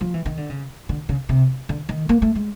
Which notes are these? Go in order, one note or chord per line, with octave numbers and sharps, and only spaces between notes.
F3
E3
D#3
D3
C#3
D3
C#3
C3
D3
D#3
A#3
A3
G#3